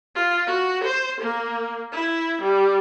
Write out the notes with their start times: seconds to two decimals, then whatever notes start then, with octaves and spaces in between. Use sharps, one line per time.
0.15 F4
0.47 F#4
0.84 C5
1.21 A#3
1.93 E4
2.42 G3